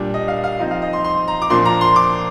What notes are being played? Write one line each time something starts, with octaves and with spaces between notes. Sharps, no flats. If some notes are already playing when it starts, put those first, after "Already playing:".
Already playing: A#2 G3 D4
D#5
F5
F5
F3 C4 D#4
F5
D#5
C6
C6
A#5
D6
A#2 F3 A#3 D4 C6
A#5
C6
D6